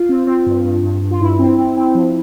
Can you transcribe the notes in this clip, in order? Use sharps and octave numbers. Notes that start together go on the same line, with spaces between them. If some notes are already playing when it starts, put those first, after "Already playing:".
Already playing: F4
C4
C4
G2
G2
G2
G2
F4
G2 E4
C4
C4
C4
F3